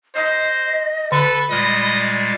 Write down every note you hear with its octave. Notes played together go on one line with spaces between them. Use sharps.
C5 D#5
D3 A4 B4 B5 C#6
A#2 G3 G#3 D#5